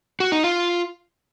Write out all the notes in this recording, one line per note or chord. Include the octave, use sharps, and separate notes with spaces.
F#4
D#4
F4